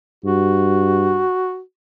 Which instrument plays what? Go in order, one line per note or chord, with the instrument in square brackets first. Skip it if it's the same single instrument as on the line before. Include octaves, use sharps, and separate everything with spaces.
[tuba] G2 [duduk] F#4